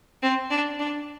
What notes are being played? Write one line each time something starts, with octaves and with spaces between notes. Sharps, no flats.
C4
D4
D4